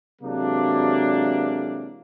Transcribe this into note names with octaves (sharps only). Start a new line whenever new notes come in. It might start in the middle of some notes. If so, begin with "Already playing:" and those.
C3 E3 F#3 G#3 A#3 D4